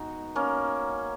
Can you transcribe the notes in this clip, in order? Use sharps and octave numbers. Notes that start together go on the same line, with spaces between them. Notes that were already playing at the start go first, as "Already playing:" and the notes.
Already playing: B2 G#3 D#4 F#4
A#3 C#4